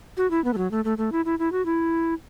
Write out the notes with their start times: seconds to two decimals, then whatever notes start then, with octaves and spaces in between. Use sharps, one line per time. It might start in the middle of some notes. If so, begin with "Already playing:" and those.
0.17 F#4
0.31 E4
0.44 B3
0.53 A3
0.58 F#3
0.71 A3
0.85 A3
0.98 A3
1.12 E4
1.25 E4
1.39 E4
1.52 F#4
1.65 E4